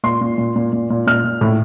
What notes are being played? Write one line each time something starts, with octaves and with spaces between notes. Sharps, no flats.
A#2 C6
A#2
A#2
A#2
A#2
A#2
A#2 F6
A#2
A2